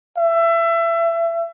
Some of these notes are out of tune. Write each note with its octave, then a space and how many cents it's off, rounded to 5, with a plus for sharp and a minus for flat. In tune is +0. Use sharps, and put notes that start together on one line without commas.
E5 +25